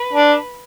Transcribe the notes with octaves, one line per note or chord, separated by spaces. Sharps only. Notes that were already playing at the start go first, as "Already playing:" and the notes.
Already playing: B4
D4